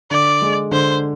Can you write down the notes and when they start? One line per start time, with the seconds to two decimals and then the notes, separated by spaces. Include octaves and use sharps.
0.11 D3 D5
0.42 G#3
0.71 D3 C5